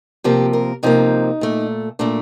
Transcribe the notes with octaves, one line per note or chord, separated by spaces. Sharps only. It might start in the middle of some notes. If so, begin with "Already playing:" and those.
C3 F3 A#3 G4
A#4
C3 F3 A#3 D#4
A#2 A3
A#2 A3 D4